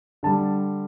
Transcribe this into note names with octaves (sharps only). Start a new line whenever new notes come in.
D3 G3 A5